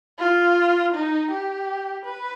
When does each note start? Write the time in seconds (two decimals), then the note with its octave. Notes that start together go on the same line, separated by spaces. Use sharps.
0.19 F4
0.94 D#4
1.31 G4
2.05 B4